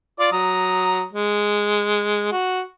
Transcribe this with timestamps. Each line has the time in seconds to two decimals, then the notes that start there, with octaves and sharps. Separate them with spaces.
0.20 F4 D5 D6
0.32 F#3 A#5 D#6
1.13 G#3
2.32 F#4